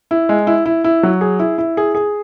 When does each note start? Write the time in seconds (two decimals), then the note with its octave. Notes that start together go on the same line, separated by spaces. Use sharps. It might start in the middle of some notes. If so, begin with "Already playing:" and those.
0.11 E4
0.29 G#3
0.47 E4
0.66 E4
0.84 E4
1.03 F#3
1.21 G#4
1.39 E4
1.58 E4
1.77 G#4
1.95 G#4